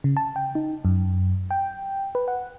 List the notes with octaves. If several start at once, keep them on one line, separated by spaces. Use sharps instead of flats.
C#3
A5
G5
D#4
F#2
G5
B4
F#5